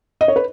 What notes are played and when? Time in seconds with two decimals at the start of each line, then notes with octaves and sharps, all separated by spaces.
0.21 D#5
0.28 C#5
0.36 B4